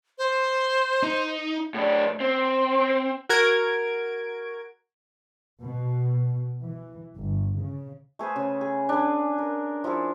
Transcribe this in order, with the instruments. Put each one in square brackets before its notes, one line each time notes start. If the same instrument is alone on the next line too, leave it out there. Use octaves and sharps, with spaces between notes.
[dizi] C5
[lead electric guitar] D#4
A2 D4
C4
[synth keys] F#4 A#4 G#6 D7
[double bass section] B2
E3
G1
C#3
[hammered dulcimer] A3 G#4 B4 C5
C#3
G#4
D4 G#4 B4
A#4
F3 E4 G#4 A4